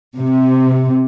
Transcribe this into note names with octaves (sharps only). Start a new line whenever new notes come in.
C3